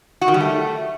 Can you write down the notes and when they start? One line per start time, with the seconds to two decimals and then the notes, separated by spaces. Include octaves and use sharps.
0.21 F#4
0.28 D#3
0.34 G3
0.40 A3